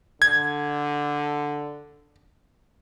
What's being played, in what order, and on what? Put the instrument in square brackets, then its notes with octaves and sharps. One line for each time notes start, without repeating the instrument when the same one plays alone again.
[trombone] D3 [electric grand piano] G#6